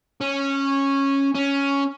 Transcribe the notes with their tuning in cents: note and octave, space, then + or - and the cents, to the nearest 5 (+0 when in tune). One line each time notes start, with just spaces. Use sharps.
C#4 -10
C#4 +5